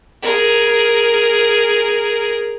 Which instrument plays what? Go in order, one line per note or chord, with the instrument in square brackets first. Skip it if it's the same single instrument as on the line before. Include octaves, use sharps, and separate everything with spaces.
[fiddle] G#4 A#4